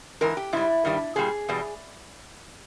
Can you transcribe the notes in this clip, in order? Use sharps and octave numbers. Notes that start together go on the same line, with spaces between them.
G#2 E3 A#4
G4
G#2 G3 E4
G2 D#3 G3
A#2 G3 G#4
E2 B2 G3